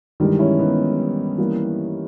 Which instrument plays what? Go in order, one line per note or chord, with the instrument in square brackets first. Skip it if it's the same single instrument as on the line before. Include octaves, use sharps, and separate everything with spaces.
[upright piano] G2 E3 G#3 [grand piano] D#3 G3
[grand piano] C#4 E4
B3 D#4
[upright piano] E3 G3 A#3 E4